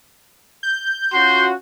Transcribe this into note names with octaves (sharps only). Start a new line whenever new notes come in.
G6
C#4 F4 F#4 C6